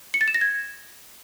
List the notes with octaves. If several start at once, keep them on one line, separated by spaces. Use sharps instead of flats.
C#7
A6
E7
A#6
G#6